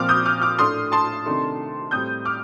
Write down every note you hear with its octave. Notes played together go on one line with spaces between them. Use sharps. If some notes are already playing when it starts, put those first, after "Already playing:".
Already playing: A#2 F3 C4 D6 F6
D#6 G6
D6 F6
D6 F6
A2 A3 D4 C6 D#6
A5 C6
C3 D#3 A3 D4
A2 G3 C4 D#6 G6
D6 F6